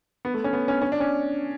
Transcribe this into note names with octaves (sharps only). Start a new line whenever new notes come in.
B3
A3
C#4
B3
C#4
C#4
D4
C#4